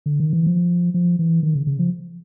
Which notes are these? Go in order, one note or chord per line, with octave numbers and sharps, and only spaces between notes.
D3
D#3
E3
F3
F3
E3
D#3
C#3
C#3
F3